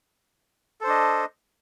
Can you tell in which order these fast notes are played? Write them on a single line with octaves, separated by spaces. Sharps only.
A4 C5 D4 D#5